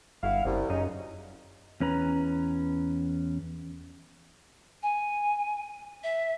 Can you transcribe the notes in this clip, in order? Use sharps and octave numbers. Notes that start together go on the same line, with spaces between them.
G1 E4 F#4 F5
F#1 C2
F#2 C#3 C#4 D#4
E2 C#4 B4 A#5
G#5
E5